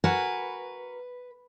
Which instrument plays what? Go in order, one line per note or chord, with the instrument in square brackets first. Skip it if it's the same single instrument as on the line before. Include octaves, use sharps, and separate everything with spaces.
[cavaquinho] F#4 A#4 G#5 [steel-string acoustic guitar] B4